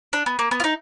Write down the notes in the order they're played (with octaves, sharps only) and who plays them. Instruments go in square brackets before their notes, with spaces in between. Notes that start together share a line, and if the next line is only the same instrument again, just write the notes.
[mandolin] D4
B3
A#3
B3
F4
D#4